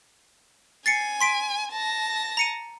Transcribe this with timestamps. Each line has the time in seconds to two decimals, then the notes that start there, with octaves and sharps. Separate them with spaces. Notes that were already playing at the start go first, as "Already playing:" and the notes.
0.86 G#5 A6 C7 C#7
1.21 C6 B6 D7
1.72 A5 A#6
2.37 A#5 C#7 D#7